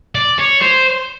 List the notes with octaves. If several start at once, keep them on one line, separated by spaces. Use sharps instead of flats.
D5
C#5
C5